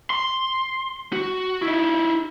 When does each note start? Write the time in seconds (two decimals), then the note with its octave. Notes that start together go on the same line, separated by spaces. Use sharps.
0.10 C6
1.13 F#4
1.62 D#4 E4